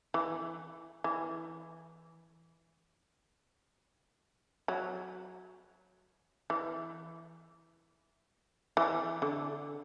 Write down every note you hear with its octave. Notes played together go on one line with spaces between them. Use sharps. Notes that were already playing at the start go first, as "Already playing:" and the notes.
E3
E3
F#3
E3
E3
D3